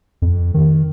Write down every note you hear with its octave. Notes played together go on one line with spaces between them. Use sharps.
F2
D#3